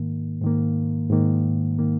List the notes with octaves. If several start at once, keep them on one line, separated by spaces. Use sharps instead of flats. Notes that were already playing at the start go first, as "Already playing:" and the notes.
Already playing: G#2 D#3 A#3
G#2 D#3 A#3
G#2 D#3 A#3
D#3 A#3